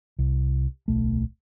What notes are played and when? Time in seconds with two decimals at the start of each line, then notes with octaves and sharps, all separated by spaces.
0.19 C2
0.88 D1 B1 A3